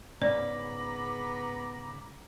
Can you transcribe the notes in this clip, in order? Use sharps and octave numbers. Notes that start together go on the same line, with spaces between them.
G#2 C#3 B3 C#4 D5 A#5 B5 D6